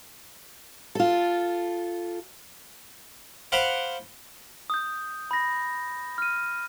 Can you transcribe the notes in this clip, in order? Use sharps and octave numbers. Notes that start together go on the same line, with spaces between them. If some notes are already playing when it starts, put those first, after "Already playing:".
F4 A4
C5 F5 F#5 B5 D6
D#6 G6
B5 A#6
F6 D#7